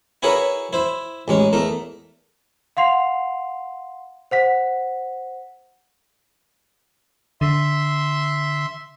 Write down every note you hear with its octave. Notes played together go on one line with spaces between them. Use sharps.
E4 F#4 G#4 A#4 B4 C#5
E4 C5
A1 G#3 C#4
E2 A3 A#4
F5 F#5 C6 C7 F7
C5 F#5 B6
D3 E5 C6